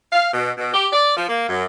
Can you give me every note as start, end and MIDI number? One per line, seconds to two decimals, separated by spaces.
0.12 0.27 77
0.34 0.51 47
0.57 0.71 47
0.74 0.87 67
0.92 1.15 74
1.16 1.25 53
1.29 1.46 58
1.48 1.64 42